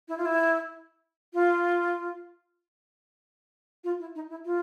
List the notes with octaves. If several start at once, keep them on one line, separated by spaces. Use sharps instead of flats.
E4
F4
E4
F4
F4
E4
D#4
E4
F4